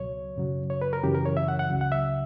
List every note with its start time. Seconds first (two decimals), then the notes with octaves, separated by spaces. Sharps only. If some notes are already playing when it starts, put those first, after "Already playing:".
Already playing: C#2 B2 F#3 C#5
0.36 F#2 C#3 F#3
0.70 C#5
0.82 B4
0.93 A#4
1.03 F#2 C#3 E3 G4
1.15 A#4
1.25 C#5
1.37 E5
1.48 F#5
1.59 F#5
1.70 C#2 C#3 F#3
1.81 F#5
1.92 E5